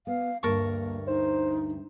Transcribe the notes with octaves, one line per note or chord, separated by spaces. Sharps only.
B3 F5
D2 G2 A#3 A#4 A5 C#6
D#4 C5